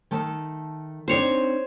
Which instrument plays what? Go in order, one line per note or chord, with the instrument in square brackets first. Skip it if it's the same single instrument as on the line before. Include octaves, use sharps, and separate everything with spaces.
[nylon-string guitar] D#3 A3 A5
[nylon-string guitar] C4 D4 D#4 [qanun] C5 C#5